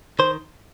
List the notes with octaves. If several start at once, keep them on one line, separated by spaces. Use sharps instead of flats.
D#3 C5